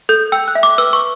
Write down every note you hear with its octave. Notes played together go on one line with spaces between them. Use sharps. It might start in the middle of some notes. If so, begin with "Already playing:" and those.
A4 G6
G5 E6
F#6
E5
D6
B4 E6
C#6